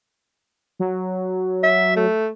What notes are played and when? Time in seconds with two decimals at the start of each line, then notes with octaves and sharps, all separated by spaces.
0.80 F#3
1.63 E5
1.96 A3